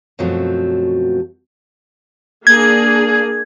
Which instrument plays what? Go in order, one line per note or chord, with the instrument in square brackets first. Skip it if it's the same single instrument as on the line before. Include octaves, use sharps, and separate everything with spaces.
[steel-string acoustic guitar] F#2 B2 F3 F#3 A3 C4
[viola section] A#3 D4 G#4 [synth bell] G#6